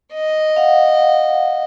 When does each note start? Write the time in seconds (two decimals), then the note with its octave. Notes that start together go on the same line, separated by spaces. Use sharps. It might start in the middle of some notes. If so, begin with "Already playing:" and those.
0.14 D#5
0.56 F5 F#5